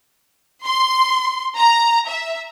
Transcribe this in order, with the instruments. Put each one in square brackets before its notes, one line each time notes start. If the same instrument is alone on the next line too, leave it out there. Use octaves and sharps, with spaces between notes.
[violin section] C6
A#5
E5